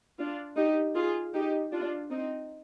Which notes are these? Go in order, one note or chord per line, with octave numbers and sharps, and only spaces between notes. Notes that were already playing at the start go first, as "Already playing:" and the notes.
D4 F4
D#4 G4
F4 G#4
D#4 G4
D4 F4
C4 D#4